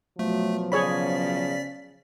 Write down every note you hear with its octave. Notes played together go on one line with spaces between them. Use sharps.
B2 F3 F#3 A3
C#3 G#4 C#5 D5 B5 B6